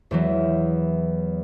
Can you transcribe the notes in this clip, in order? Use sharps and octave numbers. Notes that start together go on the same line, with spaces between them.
E2 E3 F#3